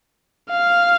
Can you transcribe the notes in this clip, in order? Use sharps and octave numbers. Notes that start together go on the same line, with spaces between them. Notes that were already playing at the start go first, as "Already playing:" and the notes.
F5